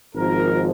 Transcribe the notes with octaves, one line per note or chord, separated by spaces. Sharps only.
G#1 G#2 F3 A#4